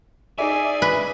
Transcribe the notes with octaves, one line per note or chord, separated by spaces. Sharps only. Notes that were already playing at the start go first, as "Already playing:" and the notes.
D#4 G#4 D5 E5 G#5
B4